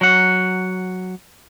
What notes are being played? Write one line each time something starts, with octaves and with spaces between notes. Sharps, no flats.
F#3 F#5